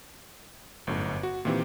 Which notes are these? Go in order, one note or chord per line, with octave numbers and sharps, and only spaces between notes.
G1 F#2 A2
F#4
A#2 D#3 E3 C4 G4